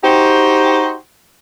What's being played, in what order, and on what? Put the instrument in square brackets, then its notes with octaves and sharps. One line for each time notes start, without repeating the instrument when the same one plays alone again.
[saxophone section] D#4 F#4 G4 C5